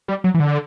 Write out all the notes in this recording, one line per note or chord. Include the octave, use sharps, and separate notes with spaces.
G3
F#3
E3
D3